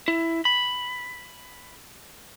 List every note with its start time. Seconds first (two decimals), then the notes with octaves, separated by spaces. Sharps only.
0.08 E4
0.45 B5